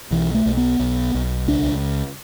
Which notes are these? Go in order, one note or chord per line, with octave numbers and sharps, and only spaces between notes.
B1 E3
A3
B1
B3
B1
B1
C#2 D4